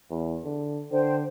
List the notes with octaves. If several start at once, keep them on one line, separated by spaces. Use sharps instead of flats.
E2
D3
D3 C5 G5